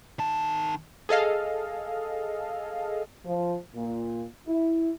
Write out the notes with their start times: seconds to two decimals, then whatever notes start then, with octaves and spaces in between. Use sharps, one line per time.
0.19 D#3 A5
1.09 G#4 A4 D#5 F5
3.25 F3
3.75 A#2
4.48 E4